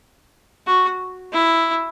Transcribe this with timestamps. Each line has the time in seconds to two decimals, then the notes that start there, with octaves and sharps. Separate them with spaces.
0.67 F#4
1.32 E4